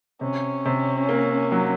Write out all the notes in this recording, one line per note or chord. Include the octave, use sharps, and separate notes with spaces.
C3 C#4
C3
A#3
F#3